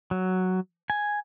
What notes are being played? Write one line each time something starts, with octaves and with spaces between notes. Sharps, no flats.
F#3
G#5